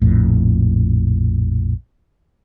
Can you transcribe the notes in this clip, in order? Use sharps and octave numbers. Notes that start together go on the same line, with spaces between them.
A#1 F2 A2